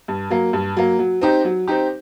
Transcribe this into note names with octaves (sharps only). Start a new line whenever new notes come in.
G2
F#3 A#3
G2
F#3 A#3
F#3
C4 D#4 G4
F#3
C4 D#4 G4